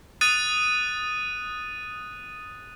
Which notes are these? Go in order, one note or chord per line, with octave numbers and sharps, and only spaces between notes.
D#6 F#6 A6 D#7